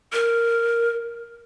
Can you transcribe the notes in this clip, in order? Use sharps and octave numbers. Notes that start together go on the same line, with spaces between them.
A#4